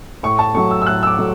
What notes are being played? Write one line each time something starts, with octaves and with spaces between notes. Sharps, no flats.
A2 C#6
A5
F#3 A3 C#6
E6
E6
A2 F#6
E6
D6
F#3 A3